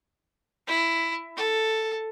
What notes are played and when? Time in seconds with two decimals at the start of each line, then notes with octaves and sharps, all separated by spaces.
0.67 E4
1.36 A4